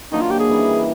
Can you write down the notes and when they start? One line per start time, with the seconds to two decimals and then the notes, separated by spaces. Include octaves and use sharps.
0.12 D#3 F#3 A#3 D4 D#4
0.21 F4
0.31 G4
0.39 G#4
0.48 C#3 E3 G3